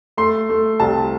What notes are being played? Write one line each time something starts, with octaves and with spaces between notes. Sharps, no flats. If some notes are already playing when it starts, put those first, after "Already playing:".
A3 C6
A3
C2 A5